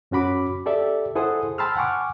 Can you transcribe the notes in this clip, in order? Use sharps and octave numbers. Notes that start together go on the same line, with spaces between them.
F#2 C#4 F#4 B5 D6
G4 A4 D5 E5
E4 G#4 A4 C5 F#5 D#6
G5 A5 B5 C6 E6 F6
F#5 G#5 C#6 D6 F6